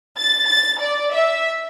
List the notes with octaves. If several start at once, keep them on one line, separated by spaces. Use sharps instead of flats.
A6
A6
D5
E5